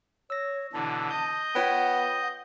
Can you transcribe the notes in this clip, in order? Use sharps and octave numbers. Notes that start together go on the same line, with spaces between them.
C#5 E6 A#6
B2 D3 E3 A5
D#5 G6
B3 F4 C#5 F#5 G5